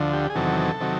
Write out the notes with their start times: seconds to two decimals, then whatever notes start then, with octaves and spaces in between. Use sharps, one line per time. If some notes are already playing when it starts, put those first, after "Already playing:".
Already playing: D2 D3 F3
0.13 G4
0.30 G#4
0.35 E2 C3 D#3 F#3 A4
0.80 C3 D#3 F#3